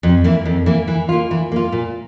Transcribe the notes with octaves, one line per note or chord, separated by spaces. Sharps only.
F2
E3 A#3
F2
E3 A#3
E3
A#3 F4
E3
A#3 F4
A#2